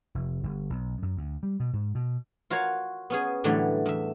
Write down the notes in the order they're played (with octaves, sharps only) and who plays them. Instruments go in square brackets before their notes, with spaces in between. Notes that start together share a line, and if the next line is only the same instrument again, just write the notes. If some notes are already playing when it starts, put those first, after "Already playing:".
[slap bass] F1
G1
B1
F#2
D2
G3
B2
G#2
B2
[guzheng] F4 F#4 A#4 C#5 F5
B3 C#4 G#4
A2 D3 E3 F#3 G3 A3
E2 E5